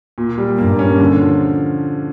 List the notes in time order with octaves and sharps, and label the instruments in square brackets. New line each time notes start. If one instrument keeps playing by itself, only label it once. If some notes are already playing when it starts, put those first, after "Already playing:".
[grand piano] A#2
G3
[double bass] G2 [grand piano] A#3
[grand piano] C#4
D3
F3